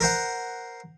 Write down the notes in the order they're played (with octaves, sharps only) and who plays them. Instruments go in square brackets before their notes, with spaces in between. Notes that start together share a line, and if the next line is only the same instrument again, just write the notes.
[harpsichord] A#4 C5 F#5